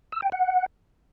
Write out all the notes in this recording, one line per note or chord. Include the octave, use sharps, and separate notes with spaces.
E6
G5
F#5